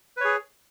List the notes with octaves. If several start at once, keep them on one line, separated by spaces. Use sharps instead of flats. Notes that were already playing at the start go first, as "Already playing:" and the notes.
G#4 B4 C#5